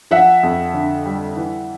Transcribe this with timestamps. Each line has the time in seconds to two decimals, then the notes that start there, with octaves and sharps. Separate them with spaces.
0.11 F3 E5 F#5
0.43 F2
0.74 D3
1.06 G3
1.37 E3